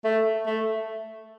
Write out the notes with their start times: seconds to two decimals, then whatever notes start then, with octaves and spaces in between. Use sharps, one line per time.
0.04 A3
0.47 A3